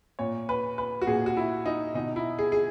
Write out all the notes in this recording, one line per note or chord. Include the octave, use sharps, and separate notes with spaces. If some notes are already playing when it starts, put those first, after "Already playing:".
A#2 C#5
B4
B4
F#4
A#2 G#4
F#4
E4
D#4
B2 D#4
E4
G#4
G#4